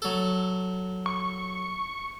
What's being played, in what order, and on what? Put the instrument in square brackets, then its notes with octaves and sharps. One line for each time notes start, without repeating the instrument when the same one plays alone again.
[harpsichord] F#3 A4
[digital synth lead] C#6